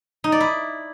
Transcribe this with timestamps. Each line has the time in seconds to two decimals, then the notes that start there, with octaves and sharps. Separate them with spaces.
0.24 D#4
0.32 D5
0.40 E4